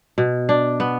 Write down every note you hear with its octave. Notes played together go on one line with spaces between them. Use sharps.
B2
D4
B3